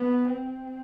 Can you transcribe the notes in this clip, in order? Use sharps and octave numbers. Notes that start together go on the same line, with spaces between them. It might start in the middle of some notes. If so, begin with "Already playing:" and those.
Already playing: B3
C4